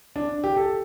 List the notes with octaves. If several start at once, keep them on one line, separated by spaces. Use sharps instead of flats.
D4
G4
A4